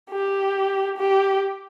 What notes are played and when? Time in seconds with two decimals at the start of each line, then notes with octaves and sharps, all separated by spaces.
0.10 G4
0.98 G4